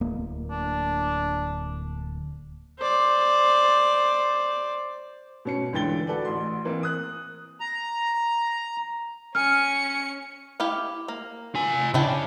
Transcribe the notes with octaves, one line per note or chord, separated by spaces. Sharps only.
D1 A#3
D4
C5 D5
B2 C#4 C#7
C#2 D3 E3 G5 A6 G7
F#4 A4 B4 D5
A1 C6
E3 A#3 C4 A#4
D#6 F#6
A#5
C#4 G#5 F6 C#7
E4 G4 F5
A#3
F4 G#5
C#3 D4 E4 G5